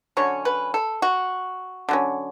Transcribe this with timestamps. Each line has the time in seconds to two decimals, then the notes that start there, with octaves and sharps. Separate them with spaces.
0.17 D3 F#3 C#4 C#5
0.45 B4
0.74 A4
1.02 F#4
1.89 D3 F#3 C#4